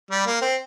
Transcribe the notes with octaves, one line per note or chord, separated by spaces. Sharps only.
G3
A#3
C4